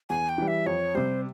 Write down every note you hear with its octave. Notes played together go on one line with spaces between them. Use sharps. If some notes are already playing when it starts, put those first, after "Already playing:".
E2 G#5
G5
E3 G3
E5
F2 C#5
C3 G3 C5